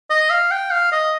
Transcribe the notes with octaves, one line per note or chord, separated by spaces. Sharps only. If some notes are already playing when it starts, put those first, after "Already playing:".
D#5
F5
G5
F5
D#5